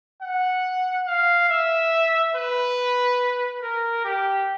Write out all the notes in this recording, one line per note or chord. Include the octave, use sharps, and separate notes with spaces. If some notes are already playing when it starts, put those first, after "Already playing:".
F#5
F5
E5
B4
A#4
G4